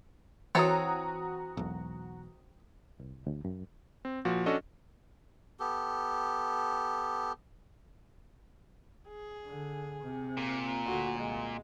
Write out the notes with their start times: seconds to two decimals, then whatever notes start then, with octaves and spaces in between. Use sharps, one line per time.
0.55 E3 C4 F#4 A4 C#5 A#5 D#6
1.57 E1 B1
3.00 C2
3.27 D2
3.45 F#2
4.05 C4
4.25 A#2 F3 F#4
4.46 C#4 D4 F#4 A4 D#5
5.60 B3 G4 A4
9.08 G#4
9.47 D3
10.03 C3
10.37 A#2
10.87 D2 D3 F#4
11.19 C2 G#3